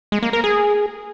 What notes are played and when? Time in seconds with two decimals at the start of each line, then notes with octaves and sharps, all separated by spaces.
0.12 G#3
0.23 A#3
0.33 A#4
0.44 G#4